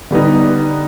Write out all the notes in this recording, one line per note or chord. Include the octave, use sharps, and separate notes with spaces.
D3 G3 B3 D#4